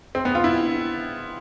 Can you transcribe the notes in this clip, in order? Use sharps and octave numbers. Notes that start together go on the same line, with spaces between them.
C4
B3
F4
E4